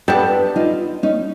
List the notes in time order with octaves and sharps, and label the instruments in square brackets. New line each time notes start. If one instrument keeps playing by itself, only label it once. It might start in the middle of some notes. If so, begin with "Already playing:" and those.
[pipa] G3 B3 D4 [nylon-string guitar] A4 B4
[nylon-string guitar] D#4 F4
C#4 D#4